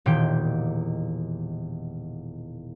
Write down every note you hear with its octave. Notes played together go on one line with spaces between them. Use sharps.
E1 A#2 D#3 G4 G5